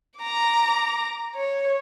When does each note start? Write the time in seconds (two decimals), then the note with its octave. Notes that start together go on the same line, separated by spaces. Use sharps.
0.19 A#5 D6
1.35 C#5